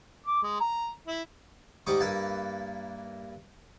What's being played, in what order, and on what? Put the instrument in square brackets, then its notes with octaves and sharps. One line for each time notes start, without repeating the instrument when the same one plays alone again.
[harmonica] D6
G#3
A#5
E4
[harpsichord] G#2 G3 D#5 A#5 C#6 D6
G2 A#3 E4 B4 A5